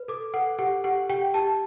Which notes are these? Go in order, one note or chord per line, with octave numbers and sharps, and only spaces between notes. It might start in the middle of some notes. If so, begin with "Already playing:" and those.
Already playing: B4
A4 D6
A4 F#5
G4 F#5
G4 F#5
G4 G5
G4 A5